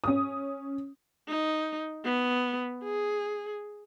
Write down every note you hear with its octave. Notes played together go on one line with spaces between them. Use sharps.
C#4 D#6
D#4
B3
G#4